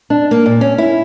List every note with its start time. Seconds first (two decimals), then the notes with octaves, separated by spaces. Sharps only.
0.10 D4
0.31 A#3
0.46 A#2
0.61 C#4
0.78 E4